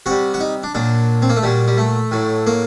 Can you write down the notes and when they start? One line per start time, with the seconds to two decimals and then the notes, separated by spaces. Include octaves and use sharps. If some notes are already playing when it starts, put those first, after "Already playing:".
0.06 C3 G3 F#4
0.34 F#4
0.40 D#4
0.63 D4
0.74 A#2 F#3 D4
1.22 C4
1.29 A#3
1.36 A3
1.43 A#2 F#3 G3
1.68 G3
1.78 A3
2.11 A2 F#3
2.46 A#3